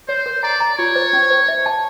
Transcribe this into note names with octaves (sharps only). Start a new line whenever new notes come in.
C5 C#5
A#4
D5 A#5
A#5
F4 C#5
C5
C#4
C5
E5
A5